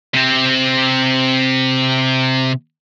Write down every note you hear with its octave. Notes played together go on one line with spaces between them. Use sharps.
C3 C4